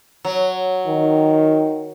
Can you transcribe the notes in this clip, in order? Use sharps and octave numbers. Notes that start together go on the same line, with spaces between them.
F#3
D#3